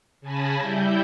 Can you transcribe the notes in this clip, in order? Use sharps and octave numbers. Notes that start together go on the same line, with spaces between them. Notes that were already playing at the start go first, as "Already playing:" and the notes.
C#3 G#5 A5 B5 A#6
G3 E4 G6